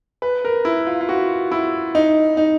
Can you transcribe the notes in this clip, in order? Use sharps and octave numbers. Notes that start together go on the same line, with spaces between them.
B4
A#4
E4
F4
F4
F#4
E4
D#4
D#4